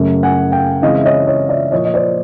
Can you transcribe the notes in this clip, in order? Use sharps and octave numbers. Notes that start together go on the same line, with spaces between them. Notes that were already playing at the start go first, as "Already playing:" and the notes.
Already playing: F#2 C#3 F#3 A3
F#5 G#5
F5 G5
C#3 E3 G#3 C4 D#5 F5
E5
C#5 D#5
C#5 D#5
D5 E5
A#2 F3 A#3 C#5 D#5
D#5
C5 D5